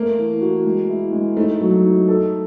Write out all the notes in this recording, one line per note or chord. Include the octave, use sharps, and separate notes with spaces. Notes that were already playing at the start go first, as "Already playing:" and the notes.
Already playing: A3 A#3
E3
F#4
G#3
E4
G#3
A3 D#4
F#3
D#4
A4